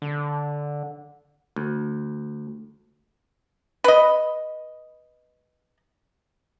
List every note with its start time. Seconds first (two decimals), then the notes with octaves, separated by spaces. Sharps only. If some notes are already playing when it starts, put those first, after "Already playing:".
0.02 D3
1.56 D2
3.84 B4 D#5